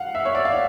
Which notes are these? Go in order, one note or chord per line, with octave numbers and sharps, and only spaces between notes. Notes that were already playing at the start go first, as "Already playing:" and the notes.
Already playing: F5 F#5
E5
C#5
D5
F5